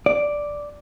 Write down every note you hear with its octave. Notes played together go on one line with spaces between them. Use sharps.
D5